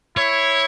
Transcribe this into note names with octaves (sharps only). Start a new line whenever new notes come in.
E4 C#5